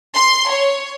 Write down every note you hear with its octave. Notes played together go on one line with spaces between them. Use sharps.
C6
C#5